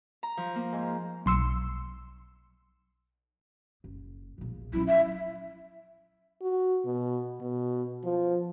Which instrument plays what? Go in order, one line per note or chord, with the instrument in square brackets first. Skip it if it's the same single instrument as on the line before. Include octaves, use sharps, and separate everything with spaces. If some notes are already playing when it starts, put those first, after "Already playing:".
[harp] A#5
F3
A#3
G#2
[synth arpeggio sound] B1 C6 E6 C#7
[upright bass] F#1
E1 A#1
[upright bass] F#3 C#4 [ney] E4
[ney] E5
[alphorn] F#4
B2
B2
F3